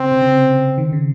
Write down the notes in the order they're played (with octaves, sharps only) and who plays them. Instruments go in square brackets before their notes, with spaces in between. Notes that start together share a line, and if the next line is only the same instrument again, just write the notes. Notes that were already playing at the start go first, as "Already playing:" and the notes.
Already playing: [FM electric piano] C#3 [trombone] C4
[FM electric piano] C3
C#3
C3
C#3
D#3
C#3